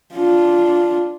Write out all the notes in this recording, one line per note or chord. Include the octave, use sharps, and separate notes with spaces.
D4 F4